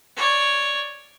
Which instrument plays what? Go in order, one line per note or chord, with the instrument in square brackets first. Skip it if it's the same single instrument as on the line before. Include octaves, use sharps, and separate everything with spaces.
[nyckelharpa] C#5 D5